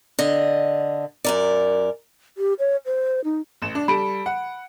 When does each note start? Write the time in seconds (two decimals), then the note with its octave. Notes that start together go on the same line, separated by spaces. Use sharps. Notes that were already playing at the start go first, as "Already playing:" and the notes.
0.19 D3 D#5
1.24 F#2 A#4 D5
2.38 G4
2.59 C#5
2.86 C5
3.24 D#4
3.62 A1 E7
3.75 D4
3.88 G3 A4 B5 D7
4.26 F#5